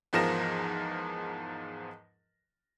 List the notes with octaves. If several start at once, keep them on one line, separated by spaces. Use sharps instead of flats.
E2 G#2 F3 A#4 A#6 E7